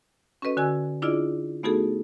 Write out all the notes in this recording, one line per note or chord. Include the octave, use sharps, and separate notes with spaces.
C#4 F#4 A4 B4 D#5
D3 F#4 G#5 E6 G#6
D4 E4 F4 G#4 D5 D#5
A3 B3 D#4 F#4 G#4 A4